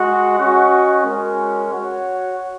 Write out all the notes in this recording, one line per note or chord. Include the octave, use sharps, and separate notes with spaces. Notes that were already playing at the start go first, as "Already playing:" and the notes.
Already playing: G#3 F#4 D#5 F#5
C#4 F#4 D#5 F#5
G#3 C#4 F#4 A#4
F#4 C#5 F#5